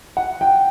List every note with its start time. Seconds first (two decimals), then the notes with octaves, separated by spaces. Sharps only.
0.17 F#5
0.41 G5